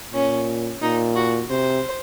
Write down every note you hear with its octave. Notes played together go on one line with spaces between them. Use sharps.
A#2 C#4
A#2 D#4
F#4
C3 C5